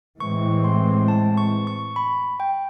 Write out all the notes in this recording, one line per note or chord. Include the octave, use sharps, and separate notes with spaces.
A2 E3 G#3 C4 C#6
C6
A5
C#6
C#6
B5
G5